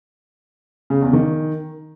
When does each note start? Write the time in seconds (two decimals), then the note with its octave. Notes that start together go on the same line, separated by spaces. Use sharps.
0.90 C#3
1.02 E2
1.13 D#3